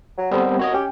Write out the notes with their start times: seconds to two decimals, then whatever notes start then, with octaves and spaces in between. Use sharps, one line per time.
0.18 F#3
0.31 D3 G3 B3 C4
0.44 D#2
0.59 F#4 C#5 D#5
0.74 C#4 G4